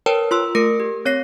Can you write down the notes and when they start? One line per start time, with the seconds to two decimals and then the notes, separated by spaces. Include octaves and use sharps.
0.06 A#4 B4 C#5 G5 A5
0.31 F4 C6 E6
0.55 A3 A#4 A#6 C#7 D7
0.80 G4
1.05 C4 C#5 A#6 C7